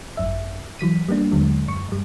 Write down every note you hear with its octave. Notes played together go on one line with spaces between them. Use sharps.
G#1 F#2 E5
E3 F#3 B6 D#7
G3 A#3 B3 D4
D#2 D3 F#3 G#3
F#2 C#6
G2 G3